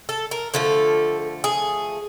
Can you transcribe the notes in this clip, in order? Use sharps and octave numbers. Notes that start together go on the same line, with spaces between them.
A4
A#4
D3 F3 A3 A4
G#4